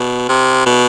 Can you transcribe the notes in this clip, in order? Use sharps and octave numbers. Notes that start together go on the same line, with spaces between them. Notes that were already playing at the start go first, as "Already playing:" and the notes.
Already playing: B2
C3
B2